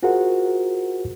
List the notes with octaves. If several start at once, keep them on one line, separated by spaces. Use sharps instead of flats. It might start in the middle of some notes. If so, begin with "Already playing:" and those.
F4 F#4 G#4 A#4 C5 F#5